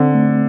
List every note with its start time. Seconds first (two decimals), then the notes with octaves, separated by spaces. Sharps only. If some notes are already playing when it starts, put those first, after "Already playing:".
Already playing: D3 C4
0.14 A3